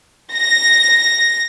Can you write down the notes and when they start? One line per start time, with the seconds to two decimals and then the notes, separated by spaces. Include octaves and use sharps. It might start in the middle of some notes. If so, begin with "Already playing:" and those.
0.34 A#6